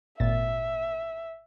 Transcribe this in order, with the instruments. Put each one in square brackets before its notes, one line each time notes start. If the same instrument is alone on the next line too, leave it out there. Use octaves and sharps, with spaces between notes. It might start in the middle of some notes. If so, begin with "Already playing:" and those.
[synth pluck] G#1 A#2 A6 [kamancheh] E5